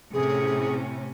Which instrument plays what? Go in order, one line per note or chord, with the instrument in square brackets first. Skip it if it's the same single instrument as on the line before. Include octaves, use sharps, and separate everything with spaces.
[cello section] A2 C3 C#4 [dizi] G#4